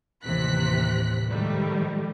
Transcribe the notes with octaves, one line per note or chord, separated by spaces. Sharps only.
A1 D#2 C3 E3 F#6 B6
G#2 D#3 F3 G3 A3